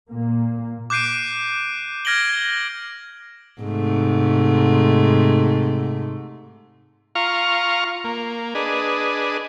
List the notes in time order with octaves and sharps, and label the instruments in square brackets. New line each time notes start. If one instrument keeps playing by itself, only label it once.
[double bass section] A#2 A#3
[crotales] D6 F#6 G6 C7 D7 D#7
F6 G#6 A#6 D7 F#7 G7
[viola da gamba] G#2 C3 A3
[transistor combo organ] F4 F5 A#5 C#6
A#3
D4 G#4 B4 D#5